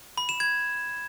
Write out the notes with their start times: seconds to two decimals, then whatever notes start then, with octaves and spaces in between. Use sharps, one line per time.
0.18 B5
0.29 E7
0.40 G#6